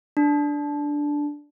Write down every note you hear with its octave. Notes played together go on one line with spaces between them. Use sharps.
D4